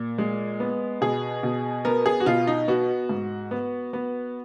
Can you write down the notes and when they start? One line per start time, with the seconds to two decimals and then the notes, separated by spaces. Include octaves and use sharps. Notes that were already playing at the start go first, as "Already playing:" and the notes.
Already playing: A#2
0.18 G#3
0.60 B3
1.01 B2 G#4
1.43 B2
1.85 B3 A#4
2.06 G#4
2.20 F#4
2.26 B2 F4
2.47 D#4
2.68 B3 F#4
3.09 G#2
3.51 B3
3.93 B3